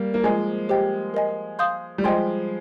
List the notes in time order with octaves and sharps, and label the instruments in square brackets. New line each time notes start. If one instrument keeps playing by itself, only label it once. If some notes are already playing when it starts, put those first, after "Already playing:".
Already playing: [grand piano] G3 A#3
A#3
[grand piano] F3 G#3 [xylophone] C5 D#5 G#5
[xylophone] G4 C5 D#5 G5
A#4 D#5 G#5
F5 C6 D#6 G6
[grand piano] G3
[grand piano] F3 G#3 [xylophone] D#5 G5 C6